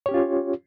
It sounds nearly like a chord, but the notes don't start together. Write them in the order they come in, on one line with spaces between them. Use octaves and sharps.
C#5 G4 C#4 F4